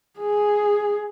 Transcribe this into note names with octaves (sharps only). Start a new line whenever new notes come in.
G#4